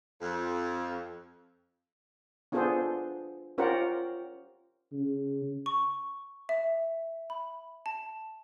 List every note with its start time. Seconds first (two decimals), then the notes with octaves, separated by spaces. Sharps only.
0.22 F2
2.52 B3 D4 F4 G#4 A4 C5
3.58 C#4 F4 G4 A#4 C5 F#5
4.92 C#3
5.66 C#6
6.49 E5
7.30 B5
7.86 A5